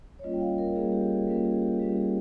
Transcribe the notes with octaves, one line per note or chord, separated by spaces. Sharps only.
C#5
G3 A#3 C#4 F4 D#5
G5
F5
A#4
G3 A#3 C#4 F4 G#4
G4
G#4
G3 A#3 C#4 F4 A#4
G#4
G4
G3 A#3 C#4 F4 G4
G#4